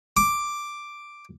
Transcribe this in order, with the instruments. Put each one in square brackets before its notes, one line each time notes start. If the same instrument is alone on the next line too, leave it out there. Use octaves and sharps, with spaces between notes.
[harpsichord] D6